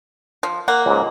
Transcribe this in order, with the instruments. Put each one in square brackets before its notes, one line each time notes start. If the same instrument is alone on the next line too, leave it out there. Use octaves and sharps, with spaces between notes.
[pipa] F3
A#3 F#5
[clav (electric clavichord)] C#2 G#2